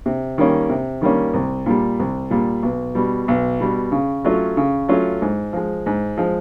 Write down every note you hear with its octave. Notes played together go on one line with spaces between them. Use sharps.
C3
D#3 G3 A#3 C#4
C3
D#3 G3 A#3 C#4
C2
A#2 G3
C2
A#2 G3
B1
B2 G3
B1
B2 G3
C#3
F#3 A3 C#4 F4
C#3
F#3 A3 C#4 F4
G#2
F3 G#3
G#2
F3 G#3